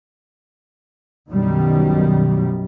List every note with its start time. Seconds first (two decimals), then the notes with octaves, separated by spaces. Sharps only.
1.29 B1 F#2 B2 D#3 G3